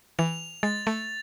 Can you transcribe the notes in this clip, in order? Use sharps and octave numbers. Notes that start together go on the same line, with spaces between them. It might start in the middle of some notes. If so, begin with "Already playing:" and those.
E3 F7
G#3 A6
A3